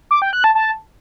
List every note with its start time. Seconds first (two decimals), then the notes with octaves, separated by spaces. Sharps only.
0.11 D6
0.22 G5
0.33 F#6
0.44 A5
0.55 A5